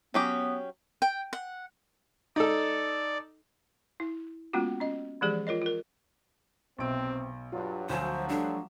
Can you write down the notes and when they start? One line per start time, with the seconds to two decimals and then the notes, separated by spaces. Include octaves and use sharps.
0.14 F#3 B3 C#4 G4
1.02 G5
1.33 F#5
2.36 D#4 A4 D5
4.00 E4
4.53 G#3 A#3 B3 C#4 F4 F#4
4.80 C#4 D#5
5.21 E3 F3 G#3 G4 G#4 D5
5.47 F4 A#4 C#5 D#5
5.62 F4 A#4
6.78 B1 C3 C4 D7
7.52 G2 F#3 F4
7.89 D2 F3 F#3 C5 G#5 E7
8.29 G3 A3 D4